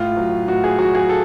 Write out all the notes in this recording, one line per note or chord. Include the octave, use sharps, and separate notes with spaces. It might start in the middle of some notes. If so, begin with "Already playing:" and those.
Already playing: A2 F4
F#3
A2 F#4
G#4
F#3 F#4
G#4
A4